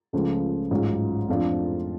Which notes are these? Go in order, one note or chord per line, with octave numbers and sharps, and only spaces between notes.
C#2 C#3 F3 A3
A1 G#2 F#3 C#4 F4
F2 F3 A3 D4 F4